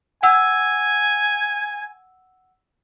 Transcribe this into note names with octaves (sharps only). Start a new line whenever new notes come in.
F#5 G#5 E6